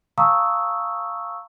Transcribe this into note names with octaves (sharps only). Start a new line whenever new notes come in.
F5 A5 A#5 C#6 D#6 E6